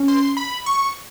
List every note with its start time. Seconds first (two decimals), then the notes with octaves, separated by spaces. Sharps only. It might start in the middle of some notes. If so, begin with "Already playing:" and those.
Already playing: C#4
0.08 C6
0.37 B5
0.66 C#6